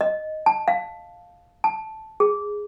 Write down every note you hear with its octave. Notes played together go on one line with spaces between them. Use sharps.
D#5
A5
F5
A5
G#4